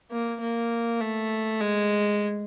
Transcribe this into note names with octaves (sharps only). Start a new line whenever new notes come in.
A#3
A#3
A3
G#3